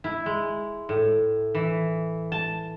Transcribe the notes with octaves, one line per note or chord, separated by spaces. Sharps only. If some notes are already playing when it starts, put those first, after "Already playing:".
E4
G#3
A2
E3
A5